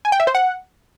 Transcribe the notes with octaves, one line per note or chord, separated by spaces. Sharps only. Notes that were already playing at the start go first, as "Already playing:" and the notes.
G#5
G5
E5
C5
F#5